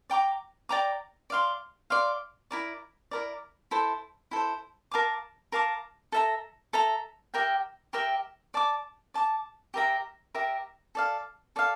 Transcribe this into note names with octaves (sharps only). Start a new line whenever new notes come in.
D5 G5 A#5 D6
D5 G5 A#5 D6
D5 F5 C6
D5 F5 C6
E4 A#4 D5
E4 A#4 D5
E4 A4 C5
E4 A4 C5
A#4 F5 A5 D6
A#4 F5 A5 D6
A4 E5 A#5
A4 E5 A#5
G4 A#4 E5 G5
G4 A#4 E5 G5
D5 A5 D6
D5 A5 D6
G4 A#4 E5 A#5
G4 A#4 E5 A#5
A4 D5 F5
A4 D5 F5